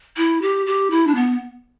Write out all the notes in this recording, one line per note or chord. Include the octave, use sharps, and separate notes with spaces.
E4
G4
G4
E4
D4
B3